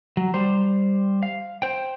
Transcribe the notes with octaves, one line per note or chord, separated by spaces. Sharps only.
F#3
G3 C5
F5
C5 G5